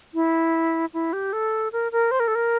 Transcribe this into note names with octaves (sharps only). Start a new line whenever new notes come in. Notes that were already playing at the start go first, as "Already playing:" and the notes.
E4
E4
G4
A4
A#4
A#4
C5
A#4
A4
A#4